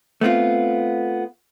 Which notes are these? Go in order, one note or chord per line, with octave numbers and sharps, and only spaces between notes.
A3 B3 C4 F4